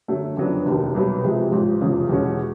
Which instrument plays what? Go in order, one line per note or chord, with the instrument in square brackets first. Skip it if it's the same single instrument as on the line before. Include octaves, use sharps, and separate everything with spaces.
[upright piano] F#2 D3 F#3 A3
F2 C#3 F#3 B3 D4
F1 D#2 D#3
C2 B2 F#3 B3
F1 F2 C3 F3 G#3
A1 G#2 F3
F1 E2 C#3 F3
E2 B2 G#3 C#4 F#4